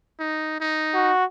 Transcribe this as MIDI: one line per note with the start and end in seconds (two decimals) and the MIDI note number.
0.20 0.60 63
0.60 1.11 63
0.94 1.24 66